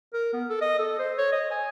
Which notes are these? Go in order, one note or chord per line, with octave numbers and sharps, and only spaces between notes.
A#4
B3
A4
D#5
A4
C5
C#5
D#5
G#5